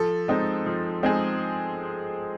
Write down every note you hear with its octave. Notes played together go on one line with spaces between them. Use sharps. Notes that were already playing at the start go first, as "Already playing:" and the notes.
Already playing: F3 A4
G#3 C4 D#4
F3
G#3 C4 D#4 G#4